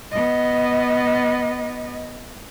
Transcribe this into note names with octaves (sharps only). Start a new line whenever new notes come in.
B3 D#5